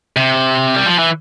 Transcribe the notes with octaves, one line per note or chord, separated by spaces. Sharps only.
C3
G3
F3
E3